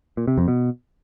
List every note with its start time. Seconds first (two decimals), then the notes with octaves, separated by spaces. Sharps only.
0.17 A#2
0.27 C3
0.38 F2
0.48 B2